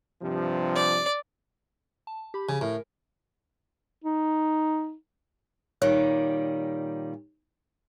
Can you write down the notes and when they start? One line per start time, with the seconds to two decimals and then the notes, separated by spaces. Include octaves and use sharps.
0.22 G2 C3 F3
0.76 D5
2.07 A5
2.34 G4 B5
2.49 C#3 G#5
2.61 A2 A#4
4.04 D#4
5.82 A#2 D#3 G3 C#5